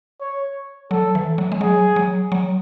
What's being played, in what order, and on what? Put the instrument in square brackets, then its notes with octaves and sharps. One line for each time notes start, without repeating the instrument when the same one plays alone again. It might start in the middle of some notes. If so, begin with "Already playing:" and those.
[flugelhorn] C#5
[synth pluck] F#3 [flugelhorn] A4
[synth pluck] E3
F#3
G#3
[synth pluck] F#3 [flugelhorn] G#4
[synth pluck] F#3
F#3